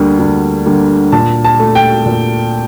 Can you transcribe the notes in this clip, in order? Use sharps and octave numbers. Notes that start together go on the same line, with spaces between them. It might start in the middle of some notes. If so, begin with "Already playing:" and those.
Already playing: D2 D3 G3 A#3
D2
D3 G3 A#3
A#2 A5
A5
A3
G5
A#2